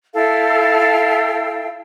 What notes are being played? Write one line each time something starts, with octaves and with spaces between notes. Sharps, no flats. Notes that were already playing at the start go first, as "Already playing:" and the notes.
E4 A4 F5 G5